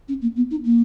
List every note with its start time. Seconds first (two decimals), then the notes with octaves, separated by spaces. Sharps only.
0.08 C#4
0.21 A#3
0.36 B3
0.50 D#4
0.65 A#3